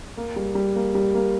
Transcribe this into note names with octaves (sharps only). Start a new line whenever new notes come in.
A#3
G3
G3
A#3
G3
A#3